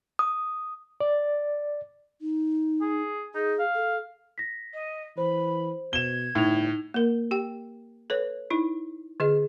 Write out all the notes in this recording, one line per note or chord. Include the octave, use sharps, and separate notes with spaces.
D#6
D5
D#4
G#4
D#4 G#4
F5
A4
A#6 B6
D#5
E3 C5 B5
B2 G#6 E7 G7
G1 A2 D#4 F7
A#3 A#4
G4 G5
A4 B4 C#5
D#4 E4
D3 G#4 D#5